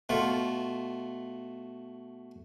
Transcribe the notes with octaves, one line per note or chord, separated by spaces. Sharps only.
B2 A3 F4